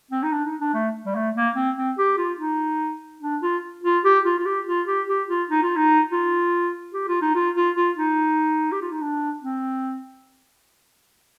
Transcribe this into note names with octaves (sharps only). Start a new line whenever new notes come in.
C4
D#4
D4
D#4
D4
A3
G3
A3
A#3
C4
C4
G4
F4
D#4
D4
F4
F4
G4
F4
F4
G4
F4
G4
G4
F4
D#4
F4
D#4
F4
G4
F4
D#4
F4
F4
F4
D#4
G4
F4
D#4
D4
C4